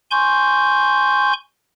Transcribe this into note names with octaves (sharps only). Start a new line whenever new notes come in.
G#5 C6 C#6 G6